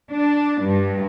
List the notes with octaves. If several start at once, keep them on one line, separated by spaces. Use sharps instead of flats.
D4
G2